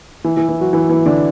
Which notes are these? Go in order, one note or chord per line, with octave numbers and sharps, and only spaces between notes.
E3 E4
E3 E4
E3 E4
F#3 F#4
E3 E4
E3 E4
D3 D4